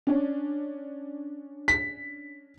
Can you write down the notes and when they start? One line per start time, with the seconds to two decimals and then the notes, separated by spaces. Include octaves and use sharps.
0.07 C#4 D4
1.68 B6